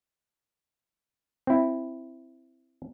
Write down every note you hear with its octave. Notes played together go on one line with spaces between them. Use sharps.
C4 E4